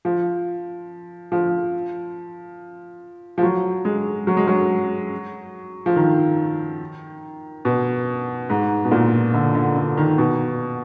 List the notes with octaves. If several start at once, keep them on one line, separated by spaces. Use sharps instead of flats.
F3
F3
F3
F#3
G#3
F#3
G#3
F#3
F3
D#3
B2
G#2
B2
A#2
D3
D3
D3
D#3
B2